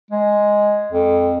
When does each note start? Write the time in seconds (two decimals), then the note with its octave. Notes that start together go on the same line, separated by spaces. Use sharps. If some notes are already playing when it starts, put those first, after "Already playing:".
0.11 G#3
0.92 F2